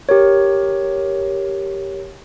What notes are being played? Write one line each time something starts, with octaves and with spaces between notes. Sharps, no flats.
G4 A#4 C#5